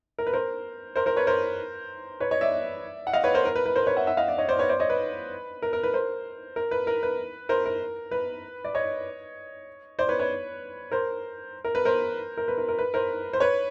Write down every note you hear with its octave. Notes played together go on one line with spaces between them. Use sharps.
A#4
B4
A#4 C5
A#4 C5
A#4 C5
B4 C#5
A#4 C5
B4 C#5
C#5 D#5
D5 E5
F#5
D#5 F5
B4 C#5
A#4 C5
A#4
B4
B4
A#4 C5
B4 C#5
E5 F#5
E5 F#5
D#5 F5
D5 E5
C#5 D#5
C5 D5
B4 C#5
C5 D5
C#5 D#5
B4
A#4
A#4
B4
A#4 C5
A#4
B4
A#4
B4
A#4 C5
A#4
B4
D5
C#5 D#5
C5 D5
B4 C#5
B4 C#5
A#4 C5
A#4
B4
A#4 C5
A#4
B4
A#4
A#4
B4
A#4 C5
C5
B4 C#5